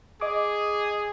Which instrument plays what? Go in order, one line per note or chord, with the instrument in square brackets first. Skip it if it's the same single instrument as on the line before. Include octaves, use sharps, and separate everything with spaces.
[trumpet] G#4 [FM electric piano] D#5 D6